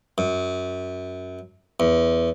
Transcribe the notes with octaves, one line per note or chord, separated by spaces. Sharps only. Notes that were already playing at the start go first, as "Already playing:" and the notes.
F#2
E2